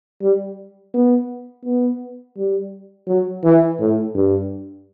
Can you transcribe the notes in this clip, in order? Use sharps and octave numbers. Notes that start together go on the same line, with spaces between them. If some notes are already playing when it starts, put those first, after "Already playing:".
G3
B3
B3
G3
F#3
E3
A2
G2